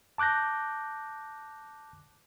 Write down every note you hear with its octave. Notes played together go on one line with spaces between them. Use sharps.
A5 D6 F#6 G6 A#6